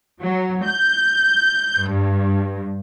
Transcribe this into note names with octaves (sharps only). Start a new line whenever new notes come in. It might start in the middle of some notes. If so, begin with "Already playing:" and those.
F#3
G6
G2